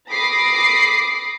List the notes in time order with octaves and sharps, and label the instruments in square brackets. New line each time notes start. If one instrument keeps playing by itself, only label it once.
[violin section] B5 D6 D#6 A#6 C7